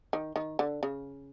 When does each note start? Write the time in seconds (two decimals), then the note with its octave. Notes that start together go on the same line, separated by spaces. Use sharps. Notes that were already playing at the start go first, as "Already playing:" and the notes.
0.13 D#3
0.36 D#3
0.59 D3
0.83 C#3